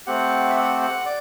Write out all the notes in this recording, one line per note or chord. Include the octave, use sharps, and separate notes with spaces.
A3 C4 G4 F#5
E5
F#5
F#5
D5